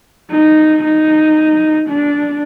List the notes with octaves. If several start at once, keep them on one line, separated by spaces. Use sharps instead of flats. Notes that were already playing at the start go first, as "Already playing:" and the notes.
D#4
D#4
D4